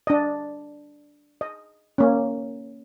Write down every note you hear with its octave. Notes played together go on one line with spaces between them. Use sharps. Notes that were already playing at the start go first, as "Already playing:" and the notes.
D4 D#5
D#5
A#3 C#4